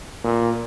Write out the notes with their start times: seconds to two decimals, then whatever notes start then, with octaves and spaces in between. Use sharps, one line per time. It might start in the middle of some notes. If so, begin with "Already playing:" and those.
0.24 A#2